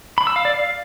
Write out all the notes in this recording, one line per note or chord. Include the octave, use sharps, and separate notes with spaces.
B5
E6
F5
D5
F5